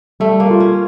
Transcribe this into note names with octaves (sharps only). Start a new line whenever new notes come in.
G3 A3
A#3
F4
C#4